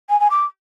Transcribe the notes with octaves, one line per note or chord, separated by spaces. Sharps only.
G#5
G#5
D6